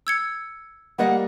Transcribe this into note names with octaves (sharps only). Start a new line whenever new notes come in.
E6 G#6 C#7
G3 A#3 D#5 F#5